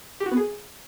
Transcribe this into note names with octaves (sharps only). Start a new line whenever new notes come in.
G4
F#4
B3
G#4